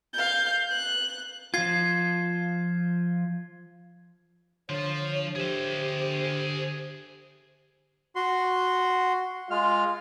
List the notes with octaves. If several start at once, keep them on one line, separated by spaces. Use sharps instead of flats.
F5 G6
F#6
F3 F4 G#6 C7
D3 F3 F4 C#5
G4 G#4 C5 E5
F#4 C6
G#3 F4 F6